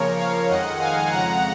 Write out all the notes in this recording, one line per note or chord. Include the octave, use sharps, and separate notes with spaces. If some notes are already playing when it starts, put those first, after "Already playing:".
Already playing: C#3 F3 A#3 A#4 C#5
C#5 F5
F2 D#3 G#3 D#4 D#5 F#5
F5 G#5
F2 C#3 G#3 F#5 A#5